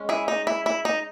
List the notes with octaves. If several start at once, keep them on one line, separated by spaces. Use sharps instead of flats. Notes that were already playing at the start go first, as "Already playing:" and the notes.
Already playing: G#3 C#4
E4 G#4
D#4
E4
E4
D#4